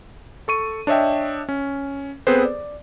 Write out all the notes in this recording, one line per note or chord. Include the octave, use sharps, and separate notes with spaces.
A4 C#6 D#7
D4 C#5 D#5 E5 G5
C#4
B3 C4 G#4 A4 B4 C5
D5